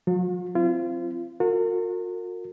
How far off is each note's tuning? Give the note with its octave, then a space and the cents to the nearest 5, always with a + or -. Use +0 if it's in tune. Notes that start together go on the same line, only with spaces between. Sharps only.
F#3 -30 F4 +40
C4 +0 F4 -35
F#4 -45 A#4 -40